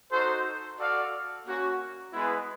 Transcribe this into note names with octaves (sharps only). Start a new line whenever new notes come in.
D#4 F#4 A4 C5
F#4 A4 D5 F5
A#3 C#4 F#4
G#3 B3 E4 G#4 B4